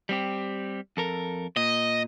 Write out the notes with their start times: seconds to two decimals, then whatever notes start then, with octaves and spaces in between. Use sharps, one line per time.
0.09 G3 C4 G4
0.97 F2 A4 A#4
1.57 A#2 D#5